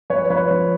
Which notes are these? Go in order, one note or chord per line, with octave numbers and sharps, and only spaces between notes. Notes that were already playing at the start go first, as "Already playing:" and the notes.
F3 B4 C#5
F3 B4 C#5
F3